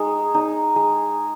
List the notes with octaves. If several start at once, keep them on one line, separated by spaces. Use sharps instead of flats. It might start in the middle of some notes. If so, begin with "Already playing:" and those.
Already playing: G#3 D#4
D#4
G#3